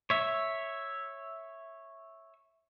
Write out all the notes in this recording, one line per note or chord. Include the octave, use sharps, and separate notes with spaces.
C#5 E5